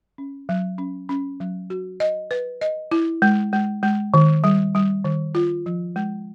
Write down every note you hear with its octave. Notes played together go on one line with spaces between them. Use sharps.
C#4
F#3
C#4
C#4
F#3
F#4
D#5
B4
D#5
E4
G#3
G#3
G#3
D#3
G3
G3
D#3
F4
F3
G#3